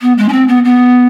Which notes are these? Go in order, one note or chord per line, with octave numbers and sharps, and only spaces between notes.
B3
G#3
C#4
C4
B3
B3